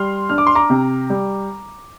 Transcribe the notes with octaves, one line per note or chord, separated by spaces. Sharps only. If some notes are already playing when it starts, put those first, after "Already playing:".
Already playing: G3 C6 F6
D4 F6
D6
C6
A#5 D6
C3
G3